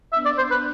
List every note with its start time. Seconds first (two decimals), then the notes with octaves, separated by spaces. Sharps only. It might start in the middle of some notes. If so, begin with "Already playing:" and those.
0.13 B3 D4 E5
0.25 D5
0.38 C5
0.50 B4